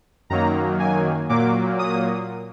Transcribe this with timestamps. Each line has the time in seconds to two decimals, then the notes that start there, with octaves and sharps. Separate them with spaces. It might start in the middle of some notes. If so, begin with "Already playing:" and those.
0.30 F#2 D#3 F#3 A#3 A#5
0.80 G#5
1.29 A#2 F#3 A#3 D6
1.79 D#6